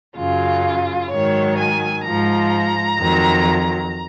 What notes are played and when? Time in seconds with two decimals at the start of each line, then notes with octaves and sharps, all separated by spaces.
0.16 F#2 C#3 F#3 F4
1.11 G#2 D#3 F#3 C#5
1.58 G#5
2.05 G#2 F3 A#5
2.99 F2 D#3 F#3